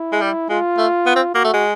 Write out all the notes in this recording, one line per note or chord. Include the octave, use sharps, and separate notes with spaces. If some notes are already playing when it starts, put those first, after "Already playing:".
Already playing: E4
G#3
G3
G#3 F4
A3
B3
C4
A#3 F#4
A3
G#3